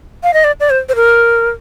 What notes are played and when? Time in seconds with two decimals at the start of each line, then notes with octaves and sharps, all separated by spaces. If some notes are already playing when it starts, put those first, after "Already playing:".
0.23 F5
0.34 D#5
0.44 D5
0.60 D5
0.70 C5
0.89 C5
0.96 A#4